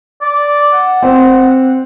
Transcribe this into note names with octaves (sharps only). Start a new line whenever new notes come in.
D5
F#5
C4